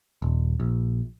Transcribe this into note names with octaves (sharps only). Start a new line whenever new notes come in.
D#1
A#1